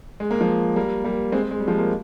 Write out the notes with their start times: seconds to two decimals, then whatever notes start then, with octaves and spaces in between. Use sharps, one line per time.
0.20 G#3
0.31 A#3
0.41 F3 G#3
0.76 G3 A#3
1.04 G3 A#3
1.32 G#3 C4
1.51 G#3
1.60 G3
1.68 F3 G#3
1.78 A#3